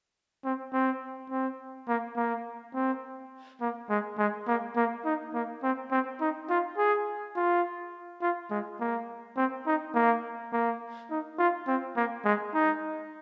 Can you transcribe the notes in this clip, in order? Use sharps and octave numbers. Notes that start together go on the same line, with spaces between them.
C4
C4
C4
A#3
A#3
C4
A#3
G#3
G#3
A#3
A#3
D#4
A#3
C4
C4
D#4
F4
G#4
F4
F4
G#3
A#3
C4
D#4
A#3
A#3
D#4
F4
C4
A#3
G#3
D#4